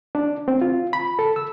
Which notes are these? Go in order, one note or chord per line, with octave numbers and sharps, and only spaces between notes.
D4
C4
F4
B5
A4
E6